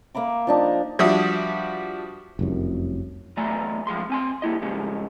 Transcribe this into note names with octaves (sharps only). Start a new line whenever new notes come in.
A#3 E5 B5 D6
F3 D4 D#4
F3 G3 D4 F#4 E5 D#6
F1 C2 F#2
E2 F#3 A3 D5 G#5 A#5
F#2 F3 G#3 C6
C4 G#5 C6
G3 A#3 E4 D#5
G#2 C#3 G3 G#3